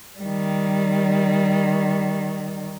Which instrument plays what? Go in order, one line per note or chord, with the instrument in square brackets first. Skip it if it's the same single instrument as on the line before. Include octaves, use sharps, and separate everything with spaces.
[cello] D#3 G3